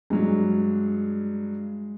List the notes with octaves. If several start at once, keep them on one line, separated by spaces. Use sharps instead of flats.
G2 F#3 G#3